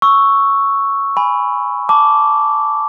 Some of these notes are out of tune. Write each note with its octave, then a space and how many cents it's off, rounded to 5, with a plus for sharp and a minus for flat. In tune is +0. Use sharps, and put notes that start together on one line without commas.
C#6 +0 E6 +0
G#5 -5 B5 +10
A5 +0 D6 -10